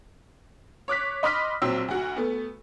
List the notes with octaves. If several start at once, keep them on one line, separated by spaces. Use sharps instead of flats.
C#5 D6 F#6 B6
D#5 B5 C6 D6 F6 B6
A#1 F#3 C4 E6
D2 F#4
A3 B3